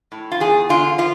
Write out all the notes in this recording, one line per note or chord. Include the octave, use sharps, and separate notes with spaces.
A2
F4
E2 G#4
D3 F4
F3 F4